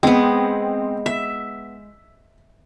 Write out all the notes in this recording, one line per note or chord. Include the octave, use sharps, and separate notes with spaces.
G#3 B3 C4
E5 B6